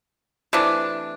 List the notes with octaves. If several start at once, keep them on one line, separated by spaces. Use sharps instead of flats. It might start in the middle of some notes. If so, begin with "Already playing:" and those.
C3 E3 A3 D4